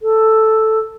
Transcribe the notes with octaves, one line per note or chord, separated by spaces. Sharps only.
A4